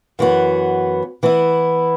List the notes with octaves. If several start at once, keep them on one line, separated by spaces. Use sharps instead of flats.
F#2 E3 B3 F#4
E3 B3 E4